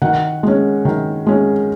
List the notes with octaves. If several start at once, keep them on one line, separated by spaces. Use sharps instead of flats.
D#3 F#5
G#3 C#4
D#3
G#3 C#4